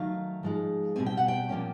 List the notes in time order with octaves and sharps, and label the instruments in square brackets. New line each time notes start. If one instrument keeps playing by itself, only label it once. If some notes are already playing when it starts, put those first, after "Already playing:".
Already playing: [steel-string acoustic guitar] D#3 F#3 A3 F5
G#2 F3 G#3
B2 G3 C4 G#5
G5
F#5
G5
A#2 F3 A#3 C#4